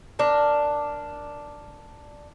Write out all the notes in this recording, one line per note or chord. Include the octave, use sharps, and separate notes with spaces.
D4 A#4